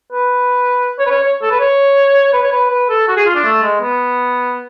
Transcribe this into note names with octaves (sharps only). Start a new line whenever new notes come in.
B4
C#5
B4
C#5
C#5
A4
B4
C#5
B4
C#5
B4
B4
A4
F#4
G#4
F4
D4
A3
G#3
B3